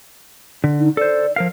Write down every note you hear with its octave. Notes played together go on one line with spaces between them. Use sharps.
D3
D#4
A4 C5 D5
F3 A#4 F5